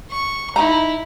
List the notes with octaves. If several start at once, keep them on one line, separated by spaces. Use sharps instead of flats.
C#6
D#4 E4 A#5